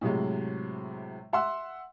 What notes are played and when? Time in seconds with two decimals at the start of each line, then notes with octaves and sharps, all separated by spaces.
0.01 A2 C3 F#3 G#3
1.33 E5 F#5 C6 E6